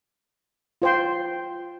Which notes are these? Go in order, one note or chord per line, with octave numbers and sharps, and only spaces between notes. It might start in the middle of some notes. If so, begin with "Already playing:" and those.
F4 C5 G5 C6